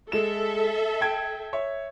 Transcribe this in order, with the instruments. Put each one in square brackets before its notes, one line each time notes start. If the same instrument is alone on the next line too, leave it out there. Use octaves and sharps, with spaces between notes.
[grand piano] G#3 E7 [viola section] A4 E5
[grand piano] G5 A5 G#6
C#5 E5